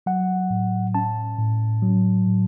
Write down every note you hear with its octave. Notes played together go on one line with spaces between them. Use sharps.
F#3 F#5
A2
C#4 A5
A2
F#3
A2